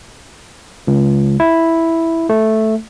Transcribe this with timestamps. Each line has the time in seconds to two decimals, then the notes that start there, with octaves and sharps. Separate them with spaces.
0.87 C#2
1.40 E4
2.29 A3